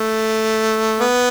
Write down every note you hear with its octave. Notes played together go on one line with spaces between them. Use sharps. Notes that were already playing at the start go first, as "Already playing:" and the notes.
Already playing: A3
B3